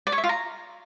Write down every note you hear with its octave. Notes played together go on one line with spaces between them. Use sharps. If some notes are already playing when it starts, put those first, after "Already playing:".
D5
C#5
E5
F4
A#5